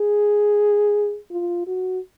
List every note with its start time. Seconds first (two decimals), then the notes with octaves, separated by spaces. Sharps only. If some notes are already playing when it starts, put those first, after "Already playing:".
Already playing: G#4
1.31 F4
1.67 F#4